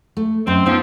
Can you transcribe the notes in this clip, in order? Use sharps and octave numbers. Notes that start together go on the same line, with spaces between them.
A3
F#2 C4 D#5
F3 B3 C4 D#4